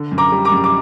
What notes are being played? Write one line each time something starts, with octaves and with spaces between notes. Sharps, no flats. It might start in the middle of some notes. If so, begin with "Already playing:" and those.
Already playing: D3
F#2
A#5 D6
G3
A#5 D6
F#2
D6